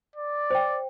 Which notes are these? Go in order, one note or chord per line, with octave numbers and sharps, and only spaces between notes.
D5
C5 G5